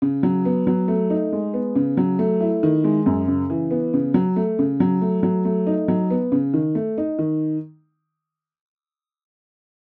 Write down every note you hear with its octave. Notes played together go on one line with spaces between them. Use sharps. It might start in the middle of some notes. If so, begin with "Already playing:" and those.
C#3
F#3
B3
F#3
A3
D#4
G#3
B3
C#3
F#3
A3
E4
D#3
G#3
F#2
C#3
E3
B3
C#3
F#3
A3
C#3
F#3
A3
F#3
A3
D#4
F#3
B3
C#3
D#3
A3
D#4
D#3